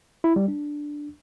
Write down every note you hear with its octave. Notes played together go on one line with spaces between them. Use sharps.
E4
G3
D4